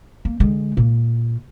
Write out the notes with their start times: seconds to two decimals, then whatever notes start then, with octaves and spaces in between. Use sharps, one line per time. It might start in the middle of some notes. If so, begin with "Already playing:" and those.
0.25 A#3
0.40 D3 G#3
0.77 A#2